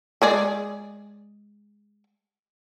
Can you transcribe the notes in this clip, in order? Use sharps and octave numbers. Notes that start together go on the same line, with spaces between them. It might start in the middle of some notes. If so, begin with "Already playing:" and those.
G#3 G#4 D5